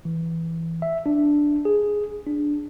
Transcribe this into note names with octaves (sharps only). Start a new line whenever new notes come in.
E3
E5
D4
G#4
D4